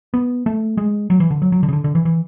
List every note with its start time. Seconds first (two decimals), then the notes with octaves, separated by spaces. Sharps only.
0.14 B3
0.46 A3
0.77 G#3
1.10 F#3
1.20 E3
1.31 D3
1.42 F#3
1.52 F#3
1.63 D3
1.69 C#3
1.73 D3
1.84 D3
1.95 E3
2.05 E3